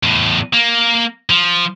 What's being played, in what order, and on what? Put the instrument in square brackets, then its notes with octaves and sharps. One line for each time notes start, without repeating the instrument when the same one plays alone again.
[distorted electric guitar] E2 A2
A#3
F3